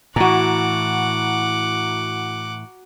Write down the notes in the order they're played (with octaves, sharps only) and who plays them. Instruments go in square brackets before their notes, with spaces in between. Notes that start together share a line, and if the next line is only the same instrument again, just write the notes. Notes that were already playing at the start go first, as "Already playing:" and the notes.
[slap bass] A2 E3 [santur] F#4 A#5 [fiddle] F#5 D6